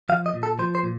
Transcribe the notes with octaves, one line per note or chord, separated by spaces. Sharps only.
F3 F5
D#5
A#2
A4
F3 C5
C5
A#2